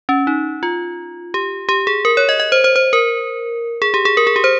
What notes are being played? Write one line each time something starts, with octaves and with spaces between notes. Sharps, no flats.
C#4
D#4
F4
G4
G4
G#4
A#4
C#5
D#5
D#5
C5
C5
C5
A#4
G#4
G4
G#4
A#4
G#4
G4
C5